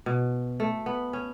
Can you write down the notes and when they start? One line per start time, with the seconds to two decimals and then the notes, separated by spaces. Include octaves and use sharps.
0.06 B2
0.60 A3
0.86 B3
1.13 C#4